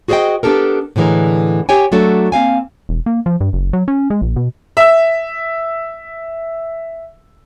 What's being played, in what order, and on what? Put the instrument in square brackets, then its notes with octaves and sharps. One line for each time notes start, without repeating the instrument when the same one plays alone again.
[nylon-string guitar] F#4 G#4 C5 C#5 D#5 G5
B3 D4 G4 A4 A#4
A2 D3 E3 G#3 A#4
G4 C#5 G5 G#5
F#3 A3 D4 F#4 A4
A#3 C4 F5 G#5
[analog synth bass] E1
A#3
F3
G2
F#1
F#3
C#4
G#3
A#1
B2
[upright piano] E5 E6